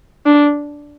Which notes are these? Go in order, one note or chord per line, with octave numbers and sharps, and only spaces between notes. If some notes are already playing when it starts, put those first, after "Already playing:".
D4